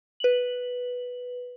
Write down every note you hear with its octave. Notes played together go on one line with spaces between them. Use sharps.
B4 F#7